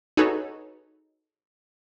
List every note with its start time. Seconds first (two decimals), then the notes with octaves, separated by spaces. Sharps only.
0.17 D#4 F#4 G#4 A4 B4 C#5